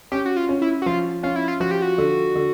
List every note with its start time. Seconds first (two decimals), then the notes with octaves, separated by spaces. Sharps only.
0.12 C#4 G4
0.25 F#4
0.37 F4
0.49 C#4
0.62 E4
0.82 F#4
0.86 F3 F4
1.23 C#4 F4
1.36 E4
1.48 F4
1.60 F3 F#4
1.71 G4
1.82 F#4
1.98 D3
2.35 D3